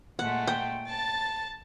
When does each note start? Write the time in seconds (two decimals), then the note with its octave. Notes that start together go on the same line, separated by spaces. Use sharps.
0.19 A#2 G#3 A3 F#5
0.47 G5
0.88 A5 A6